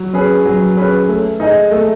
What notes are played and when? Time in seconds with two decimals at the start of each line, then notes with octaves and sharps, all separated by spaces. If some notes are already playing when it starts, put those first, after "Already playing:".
Already playing: F#3
0.13 C#4 G#4 B4
0.45 F#3
0.77 C#4 G#4 B4
1.09 A3
1.40 D#4 G#4 D#5
1.71 A3